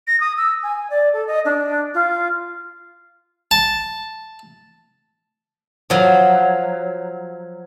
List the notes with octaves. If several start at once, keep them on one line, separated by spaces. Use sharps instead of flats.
A#6
D#6
E6
G#5
D5
A4
D#5
D4
F4
A5
F3 F#3